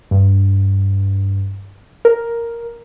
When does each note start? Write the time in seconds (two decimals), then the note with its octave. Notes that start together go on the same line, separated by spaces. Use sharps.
0.11 G2
2.05 A#4